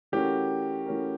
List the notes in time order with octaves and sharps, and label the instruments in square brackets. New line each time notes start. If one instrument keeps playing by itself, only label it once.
[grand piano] E3 A3 C#4 F#4 A#4 [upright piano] G4
[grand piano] E3 A3 C#4 F#4 A#4